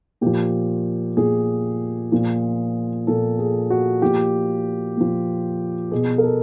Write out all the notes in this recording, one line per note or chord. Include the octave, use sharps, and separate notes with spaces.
A#2 F3 G4
A#2 F3 G#4
A#2 F3
A#2 F3 A4
G#4
F#4
A#2 F3 G4
A#2 F3
B2 G#4
A#4
A4